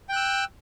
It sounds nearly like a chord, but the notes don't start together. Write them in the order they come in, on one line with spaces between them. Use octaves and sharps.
G5 F#6 E6